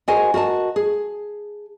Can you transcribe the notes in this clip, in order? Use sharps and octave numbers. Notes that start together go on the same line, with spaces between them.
F#4 G#4 A#4 C5 D#5 G#5
F#4 A#4 D#5 A5
G#4